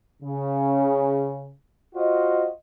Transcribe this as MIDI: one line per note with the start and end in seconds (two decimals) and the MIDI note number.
0.22 1.51 49
1.95 2.48 65
1.95 2.48 66
1.95 2.48 72
1.95 2.48 75